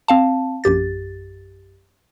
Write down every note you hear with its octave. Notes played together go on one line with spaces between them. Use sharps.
C4 F5 A5
A#1 F#2 G4 A6